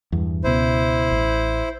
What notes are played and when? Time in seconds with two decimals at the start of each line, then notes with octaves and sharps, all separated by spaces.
0.12 E2 G2
0.44 C#2 B2 E4 C5
1.11 A1